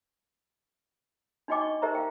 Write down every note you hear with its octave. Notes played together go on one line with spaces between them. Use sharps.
D4 D#4 F#4 D#5 G5 D6
C#6
D#4 G4 A#4 C5 E5 A#5
F5 G5